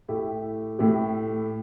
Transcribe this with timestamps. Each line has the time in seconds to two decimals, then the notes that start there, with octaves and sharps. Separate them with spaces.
0.08 A2 A3 E4 G4
0.79 A2 A3 E4 G4